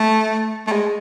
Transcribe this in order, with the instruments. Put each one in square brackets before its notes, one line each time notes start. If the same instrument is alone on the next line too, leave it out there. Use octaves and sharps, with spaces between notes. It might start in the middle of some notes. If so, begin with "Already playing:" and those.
Already playing: [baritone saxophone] A3
A3
G#3